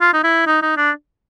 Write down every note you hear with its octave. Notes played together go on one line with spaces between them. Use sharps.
F4
D#4
E4
D#4
D#4
D4